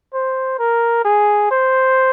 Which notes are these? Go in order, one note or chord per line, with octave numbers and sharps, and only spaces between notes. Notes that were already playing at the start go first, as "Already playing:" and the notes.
C5
A#4
G#4
C5